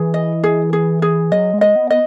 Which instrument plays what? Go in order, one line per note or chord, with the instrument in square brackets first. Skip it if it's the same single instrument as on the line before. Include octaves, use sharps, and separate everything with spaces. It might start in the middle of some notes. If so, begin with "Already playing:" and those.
Already playing: [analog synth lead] E3 [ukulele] G#4
[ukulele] D#5
G#4
G#4
G#4
[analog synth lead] F#3 [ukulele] D#5
[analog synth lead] G#3
[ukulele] D#5
[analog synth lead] B3
[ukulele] D#5